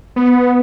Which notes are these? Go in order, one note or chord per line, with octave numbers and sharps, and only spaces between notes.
B3